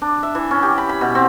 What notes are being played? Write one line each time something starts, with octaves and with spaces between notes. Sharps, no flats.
D4
E5
E3
C#4
G4
B5
B5
B2
C4